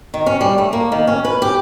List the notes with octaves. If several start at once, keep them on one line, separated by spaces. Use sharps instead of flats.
D#3
C#4
G3
A3
A#3
D#3
C#4
B4
G4